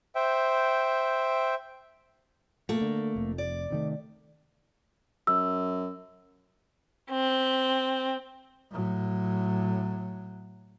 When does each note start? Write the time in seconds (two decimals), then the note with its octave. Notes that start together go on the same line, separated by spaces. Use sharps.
0.15 C5 E5 G5
2.69 A#2 A3 A#3
2.81 D3
3.16 F1 F2
3.38 D5
3.70 C3 D#3 A3
5.27 F#2 E6
7.11 C4
8.71 A2 F#3